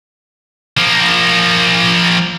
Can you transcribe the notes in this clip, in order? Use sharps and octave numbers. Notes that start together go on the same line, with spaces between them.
F3 A#3